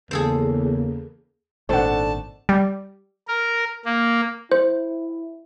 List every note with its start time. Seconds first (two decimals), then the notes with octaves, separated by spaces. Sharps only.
0.11 E2 C#3 A#3 G#4 A4 C5
1.69 G#1 A#2 D#3 A3 D4 C5 F#5 A5
2.49 G3
3.28 A#4
3.86 A#3
4.52 E4 C5